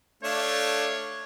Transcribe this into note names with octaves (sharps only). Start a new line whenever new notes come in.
A3 D4 C#5 F5